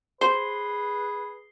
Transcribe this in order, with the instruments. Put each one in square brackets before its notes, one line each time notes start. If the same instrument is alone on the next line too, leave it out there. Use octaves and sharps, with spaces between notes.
[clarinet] G#4 [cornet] B4 [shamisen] C5 [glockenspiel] C7 G7